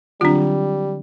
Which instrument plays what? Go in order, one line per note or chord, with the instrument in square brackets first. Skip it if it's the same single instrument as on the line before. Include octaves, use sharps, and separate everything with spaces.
[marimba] D3 F#3 C4 [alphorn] G3 [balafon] D4 F4